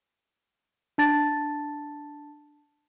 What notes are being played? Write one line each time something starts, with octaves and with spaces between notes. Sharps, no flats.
D4 A5 A6